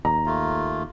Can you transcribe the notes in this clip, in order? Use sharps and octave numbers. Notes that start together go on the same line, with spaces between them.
D#2 A#5
A3 A#3 F4